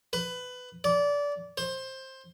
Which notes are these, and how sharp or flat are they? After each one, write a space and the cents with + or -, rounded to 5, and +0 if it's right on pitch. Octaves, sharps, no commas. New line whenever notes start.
B4 +15
D5 -25
C5 +15